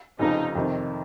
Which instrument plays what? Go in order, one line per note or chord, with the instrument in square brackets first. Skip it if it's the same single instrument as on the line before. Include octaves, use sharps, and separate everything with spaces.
[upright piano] F1 F2 C#3 F3 [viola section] D#4
[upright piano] F2 C3 D#3